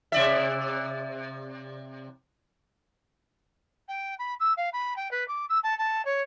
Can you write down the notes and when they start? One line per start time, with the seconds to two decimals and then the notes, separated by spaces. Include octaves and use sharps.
0.12 C3 D5 E5
3.89 G5
4.19 B5
4.40 E6
4.57 F5
4.73 B5
4.97 G5
5.11 B4
5.28 D6
5.49 E6
5.64 A5
5.78 A5
6.05 C#5